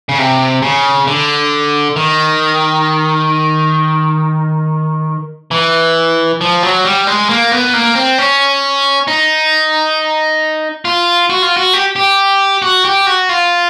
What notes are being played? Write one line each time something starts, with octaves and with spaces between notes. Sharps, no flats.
C#3
C3
C#3
D3
D#3
E3
F3
F#3
G3
G#3
A#3
B3
A#3
C4
C#4
D#4
F4
F#4
F4
F#4
G4
G4
F#4
G4
F#4
F4